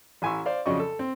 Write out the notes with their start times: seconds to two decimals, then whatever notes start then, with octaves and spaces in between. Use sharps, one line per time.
0.22 A1 E4 G#5 C6 C#6 E6
0.46 C5 D5 F5
0.66 F2 C#3 F#3 D5 D#5 C#6
0.79 A4
0.99 C4